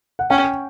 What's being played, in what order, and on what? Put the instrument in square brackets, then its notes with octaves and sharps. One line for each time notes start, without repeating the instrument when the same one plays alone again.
[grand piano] F#5
[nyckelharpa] C#4 [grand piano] G5